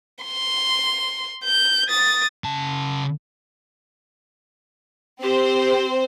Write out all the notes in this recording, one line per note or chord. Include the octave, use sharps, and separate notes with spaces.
C6
G6
D#6 A6
C#3 A5
C4 G4 C5